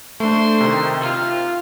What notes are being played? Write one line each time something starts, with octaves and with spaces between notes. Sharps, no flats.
A3 D4 C5 C6
C3 D#3
C3 F4